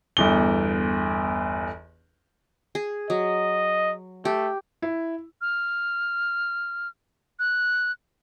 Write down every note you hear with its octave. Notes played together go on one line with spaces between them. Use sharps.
G1 E2 G7
G#4
F#3 D#5
A3 G4
E4
F6
F#6